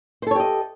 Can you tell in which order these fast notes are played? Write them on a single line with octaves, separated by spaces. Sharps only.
C5 A4 C#5 G4 D#5